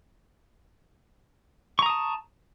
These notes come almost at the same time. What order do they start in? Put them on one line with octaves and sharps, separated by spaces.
C#6 A#5 D#6 A5